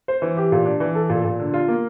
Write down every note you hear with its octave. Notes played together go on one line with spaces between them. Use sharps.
C5
E3
G4
A#2
D4
E3
A4
A#2
A#2
D3
F4
A#3